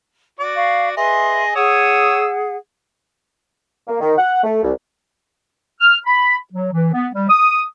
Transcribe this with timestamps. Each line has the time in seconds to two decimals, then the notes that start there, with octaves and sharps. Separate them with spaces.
0.40 F#4 D5 D6
0.57 F5 C#6
0.97 G#4 B4 D#5 E5 C6
1.55 G#4 C#5 F#5 D#6 E6
3.88 A#3
4.01 D#3
4.18 F#5
4.43 A3
4.63 C2
5.81 F6
6.06 B5
6.53 F#3
6.72 E3
6.93 B3
7.14 G3
7.29 D#6